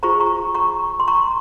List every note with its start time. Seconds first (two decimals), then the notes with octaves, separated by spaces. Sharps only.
0.03 F4 G#4 C5 A#5 C#6
0.20 A#5 C#6
0.55 A#5 C#6
1.00 C6
1.08 A#5 C#6